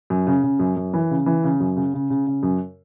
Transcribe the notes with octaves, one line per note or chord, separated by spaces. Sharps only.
F#2
C#3
C#3
F#2
F#2
E3
C#3
E3
C#3
F#2
C#3
C#3
C#3
C#3
F#2